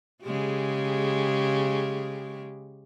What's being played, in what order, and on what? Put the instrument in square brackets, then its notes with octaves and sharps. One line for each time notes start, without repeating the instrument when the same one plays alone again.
[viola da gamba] C#3 G#3 G4